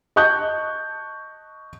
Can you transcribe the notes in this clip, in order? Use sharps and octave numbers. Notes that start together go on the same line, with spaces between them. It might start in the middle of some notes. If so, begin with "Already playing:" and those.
D#5 A5 C#6 F#6 G6